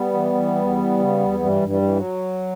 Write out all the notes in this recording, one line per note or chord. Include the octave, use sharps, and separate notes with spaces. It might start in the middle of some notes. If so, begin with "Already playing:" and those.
Already playing: G3 B3
E3
E3
E2
E3
C#3
E2
G2 E3 G3
G2
E3 G3
E3
F#3